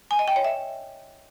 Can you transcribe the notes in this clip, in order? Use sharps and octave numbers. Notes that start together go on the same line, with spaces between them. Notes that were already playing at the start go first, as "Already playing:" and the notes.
G#5
D#5
G5
C#5
E5